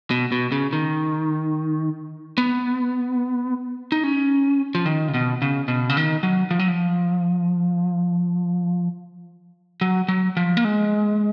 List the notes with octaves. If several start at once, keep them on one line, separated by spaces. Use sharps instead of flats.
B2
B2
C#3
D#3
B3
D#4
C#4
F3
D#3
C#3
B2
C#3
B2
C#3
D#3
F#3
F3
F#3
F3
F#3
F#3
F3
A#3
G#3